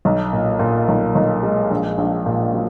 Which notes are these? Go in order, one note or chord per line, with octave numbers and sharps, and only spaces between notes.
B1
A#2
A#2
B1
B1
G#3
A#1
A#1
A#2
F#3